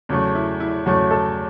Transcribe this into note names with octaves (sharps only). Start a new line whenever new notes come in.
E2 C#3 F#3 A3
E4
E4
E2 C#3 F#3 A3 F#4
A4